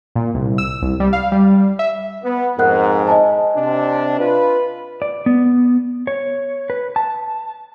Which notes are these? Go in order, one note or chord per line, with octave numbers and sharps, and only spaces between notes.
A#2
C2
E6
C2
G3
F5
G3
E5
B3
F2 G#2 A#4 F#5 F#6
D#5 G#5 A5
C3 D4
F4 B4
D5
B3
C#5
B4
A5